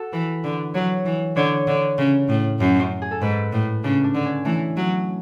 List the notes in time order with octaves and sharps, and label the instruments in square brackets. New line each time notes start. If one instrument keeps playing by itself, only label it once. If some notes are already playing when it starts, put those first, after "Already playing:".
Already playing: [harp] F#4 A4
[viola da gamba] E3 [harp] B4
[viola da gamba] D3
[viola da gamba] F#3 [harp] C#5
[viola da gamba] E3
[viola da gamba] D3 [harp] C#5
[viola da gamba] D3
C#3
A2
F#2
[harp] G#4
A4
[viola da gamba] G#2 [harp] B4
[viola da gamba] A2
[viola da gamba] C#3 [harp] D4
[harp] D4
[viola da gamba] D3
[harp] C#4
[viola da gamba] E3 [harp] A3
[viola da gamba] F#3